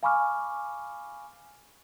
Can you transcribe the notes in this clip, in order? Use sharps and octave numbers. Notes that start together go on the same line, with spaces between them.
F5 G#5 B5 C#6 D6 F6